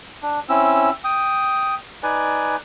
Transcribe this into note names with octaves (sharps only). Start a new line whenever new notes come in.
D4
C4 C#4 E4 E6
G5 D#6
D#4 B4 D5 G#5